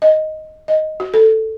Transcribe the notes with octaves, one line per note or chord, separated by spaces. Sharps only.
D#5
D#5
F#4
A4